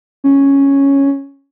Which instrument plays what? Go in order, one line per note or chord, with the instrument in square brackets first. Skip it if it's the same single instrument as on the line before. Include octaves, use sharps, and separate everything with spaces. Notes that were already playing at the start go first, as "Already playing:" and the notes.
[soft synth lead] C#4